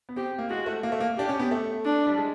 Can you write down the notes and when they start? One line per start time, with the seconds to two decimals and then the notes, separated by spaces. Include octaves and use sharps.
0.09 B3
0.16 C4 G4
0.38 A#3
0.50 G#3 F#4
0.66 A3
0.83 A#3
0.92 A3
1.00 A#3
1.18 D4 G4
1.29 C#4
1.39 B3
1.51 A3
1.85 D4
2.07 G3
2.18 G#3